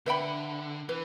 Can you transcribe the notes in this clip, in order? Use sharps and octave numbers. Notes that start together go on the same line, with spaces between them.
D3 B4 E5 G5 B5
E3 B4